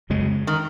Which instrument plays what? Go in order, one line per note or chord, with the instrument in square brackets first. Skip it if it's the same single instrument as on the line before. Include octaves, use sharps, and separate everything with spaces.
[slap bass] F#2 C#3 G#3
[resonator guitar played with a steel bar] D#3